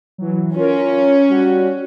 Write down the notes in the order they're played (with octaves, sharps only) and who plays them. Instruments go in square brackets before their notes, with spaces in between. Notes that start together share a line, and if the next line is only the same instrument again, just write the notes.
[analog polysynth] E3 F#3
[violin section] C#4 [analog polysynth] F4 A#4
[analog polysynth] G3 F#4